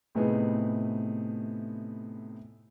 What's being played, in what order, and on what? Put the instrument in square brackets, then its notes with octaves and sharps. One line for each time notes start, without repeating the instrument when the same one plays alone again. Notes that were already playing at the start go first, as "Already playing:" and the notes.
[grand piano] A2 C3 A3 B3 D#4 G#4